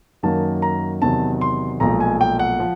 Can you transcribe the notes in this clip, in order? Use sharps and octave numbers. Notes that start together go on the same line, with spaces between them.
F#2 D#3 F#3 A#3 A5
A#5
E2 C3 D#3 F#3 A5
C6
B1 A#2 F3 G#3 A#5
G#5
G5
F#5
F3